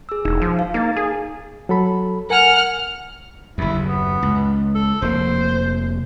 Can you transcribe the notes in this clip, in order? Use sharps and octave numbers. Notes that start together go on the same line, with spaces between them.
G#4 E6
E1 D#4
F3
F5
A#3 D#4 A6
G#4
F#3 A4 B5
A#4 F#5 G#5 F6
F#1 D#2 E4
B3
C#2
A4
F1 A#3 C5